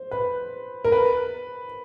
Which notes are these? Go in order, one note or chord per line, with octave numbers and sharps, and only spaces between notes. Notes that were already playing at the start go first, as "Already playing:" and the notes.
Already playing: C5
B4
A#4
B4